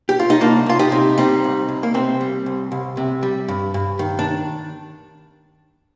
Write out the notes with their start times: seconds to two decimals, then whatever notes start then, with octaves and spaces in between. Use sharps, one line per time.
0.09 G4
0.20 F4
0.30 D#4
0.41 C2 A#3 D4
0.66 C2 F4
0.79 D#4 G4
0.92 C3
1.18 G3 C4 D#4
1.44 C2
1.68 C2
1.83 A#3
1.94 C3 C4
2.21 G3
2.46 C2
2.72 C2
2.97 C3
3.23 G3
3.48 G2
3.74 G2
3.99 D#3
4.19 D4